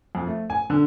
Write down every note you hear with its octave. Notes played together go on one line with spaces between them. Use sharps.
F2
A3
G#5
D3